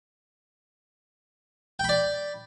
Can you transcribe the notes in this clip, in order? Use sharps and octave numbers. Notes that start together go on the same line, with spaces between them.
D5 G5 B5